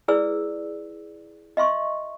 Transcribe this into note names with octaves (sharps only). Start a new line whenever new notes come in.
E4 G#4 B4 D5 E6
D#5 E5 C6 C#6